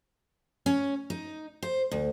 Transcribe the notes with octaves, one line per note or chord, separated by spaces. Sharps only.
C#4
D#4
C5
D2